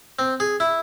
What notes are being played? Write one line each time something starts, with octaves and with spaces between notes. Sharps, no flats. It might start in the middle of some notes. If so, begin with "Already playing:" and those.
C4
G#4
E4